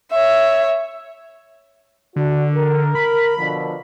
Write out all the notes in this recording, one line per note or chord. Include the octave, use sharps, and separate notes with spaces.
C#5 E5
D3 D4 F#4
A#4
B5
B2 D3 F3